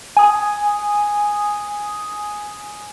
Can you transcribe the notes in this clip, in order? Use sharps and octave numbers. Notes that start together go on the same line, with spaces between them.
G#5 D#6